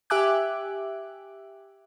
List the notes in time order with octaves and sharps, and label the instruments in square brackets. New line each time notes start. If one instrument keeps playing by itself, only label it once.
[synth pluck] G4 E5 G#5 D6 F#6